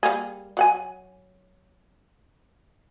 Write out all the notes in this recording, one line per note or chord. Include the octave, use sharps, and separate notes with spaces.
G3 A#3 G#4
F#3 F#5 G#5